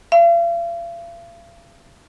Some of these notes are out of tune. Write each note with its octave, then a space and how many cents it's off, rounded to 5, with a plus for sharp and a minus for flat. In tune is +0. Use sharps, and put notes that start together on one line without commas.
F5 -40